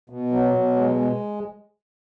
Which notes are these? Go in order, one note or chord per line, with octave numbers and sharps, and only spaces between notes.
B2
F#3
B2
G#3
G#3